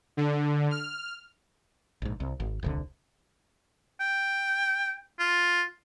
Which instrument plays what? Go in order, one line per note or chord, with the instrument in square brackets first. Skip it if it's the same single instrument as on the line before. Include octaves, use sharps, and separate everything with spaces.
[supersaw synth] D3
F6
[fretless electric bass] A#1 G#2
C2
G#1
D#1 C2 D3
[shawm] G5
F4